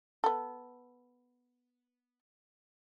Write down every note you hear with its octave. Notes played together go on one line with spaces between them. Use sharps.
B3 A4